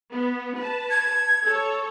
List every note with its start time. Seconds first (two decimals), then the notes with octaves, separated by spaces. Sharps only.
0.12 B3
0.56 B4 A5
0.90 G#6
1.43 A4 C#5